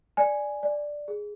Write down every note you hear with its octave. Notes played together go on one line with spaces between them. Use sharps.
D5 G#5
D5
G#4